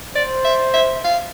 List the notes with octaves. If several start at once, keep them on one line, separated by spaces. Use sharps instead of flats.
C5 D5
E5
E5
F5